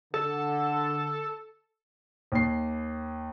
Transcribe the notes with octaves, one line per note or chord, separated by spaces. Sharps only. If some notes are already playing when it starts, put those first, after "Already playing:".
D3 A4
D#2 C7